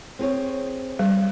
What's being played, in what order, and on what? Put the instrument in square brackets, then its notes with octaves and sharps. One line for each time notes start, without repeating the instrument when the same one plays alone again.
[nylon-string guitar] C4 G#4 C#5
[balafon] G3